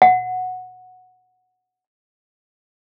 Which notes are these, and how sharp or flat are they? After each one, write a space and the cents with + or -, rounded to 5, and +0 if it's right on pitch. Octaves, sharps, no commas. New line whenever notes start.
F#5 -10